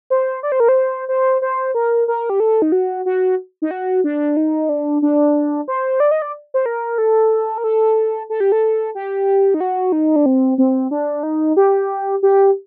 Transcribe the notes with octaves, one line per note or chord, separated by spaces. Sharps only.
C5
D5
C5
A#4
C5
C5
C5
A#4
A#4
G4
A4
D#4
F#4
F#4
D#4
F#4
D4
D#4
D4
D4
C5
D5
D#5
D5
C5
A#4
A4
A#4
A4
A4
G4
A4
G4
D#4
F#4
D#4
D4
C4
C4
D4
D#4
G4
G4